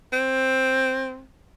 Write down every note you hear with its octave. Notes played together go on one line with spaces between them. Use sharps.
C4